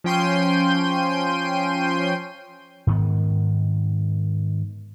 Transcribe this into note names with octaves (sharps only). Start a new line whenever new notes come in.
F3 C#4 G5 C6 G6 D#7
G#2 D#3 B3